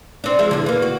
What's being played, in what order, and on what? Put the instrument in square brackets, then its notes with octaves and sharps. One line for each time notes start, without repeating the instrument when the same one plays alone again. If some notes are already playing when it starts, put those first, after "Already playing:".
[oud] C4 D4
F3 G#3 E5
E2 D3
E3 A#3
F#4